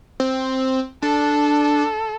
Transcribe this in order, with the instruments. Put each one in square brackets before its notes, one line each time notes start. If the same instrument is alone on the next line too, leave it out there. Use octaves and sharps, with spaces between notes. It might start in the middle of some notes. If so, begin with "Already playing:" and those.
[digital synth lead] C4
[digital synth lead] D4 [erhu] A4